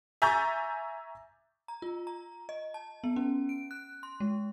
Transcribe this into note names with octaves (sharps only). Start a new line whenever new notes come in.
E5 G#5 A#5 C#6 G6 A6
A#5
F4
A#5
D#5
A5
B3
C#4
D7
F#6
C6
G#3